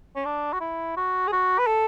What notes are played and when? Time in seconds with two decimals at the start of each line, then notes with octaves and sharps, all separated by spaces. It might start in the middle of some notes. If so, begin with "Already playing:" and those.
0.16 C#4
0.25 D4
0.53 F#4
0.61 E4
0.97 F#4
1.27 G#4
1.32 F#4
1.59 B4
1.67 A4